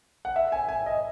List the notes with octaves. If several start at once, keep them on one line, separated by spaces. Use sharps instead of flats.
F#5
E5
G#5
G#5
D#5